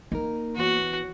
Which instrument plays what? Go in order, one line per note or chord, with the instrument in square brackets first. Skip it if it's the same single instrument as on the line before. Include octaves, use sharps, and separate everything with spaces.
[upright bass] A#3 [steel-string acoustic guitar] D#4 A#4
[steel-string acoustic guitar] E3 B3 C#5 [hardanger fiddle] F#4